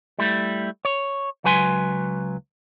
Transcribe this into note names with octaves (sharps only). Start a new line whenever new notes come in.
G3 A3 E4
C#5
C#2 F#3 B4 G#5 C6